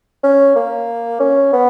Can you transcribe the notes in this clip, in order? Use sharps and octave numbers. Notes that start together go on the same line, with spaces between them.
C#4
A#3
C#4
B3